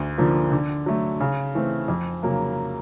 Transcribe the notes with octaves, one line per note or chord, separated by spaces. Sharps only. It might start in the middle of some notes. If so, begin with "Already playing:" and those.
Already playing: D2
D3 F3 A#3
D3
F#3 A3
C#3
E3 A3 C4
F2
C#3 F#3 A#3